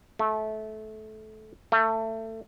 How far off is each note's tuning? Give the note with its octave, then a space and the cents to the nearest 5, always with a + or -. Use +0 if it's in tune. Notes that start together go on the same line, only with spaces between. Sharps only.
A3 -20
A3 +25